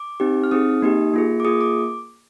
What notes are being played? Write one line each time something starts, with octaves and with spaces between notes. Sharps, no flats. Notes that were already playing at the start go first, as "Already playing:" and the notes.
Already playing: D6
C4 D#4 G4
F6
C4 D#4 G#4 D#6
A#3 D#4 G4
A#3 F4 G#4
D6
A#3 F4 G#4 D#6
D6